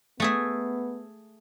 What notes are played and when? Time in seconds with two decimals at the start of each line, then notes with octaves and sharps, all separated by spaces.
0.20 A3 B3 G#4 E5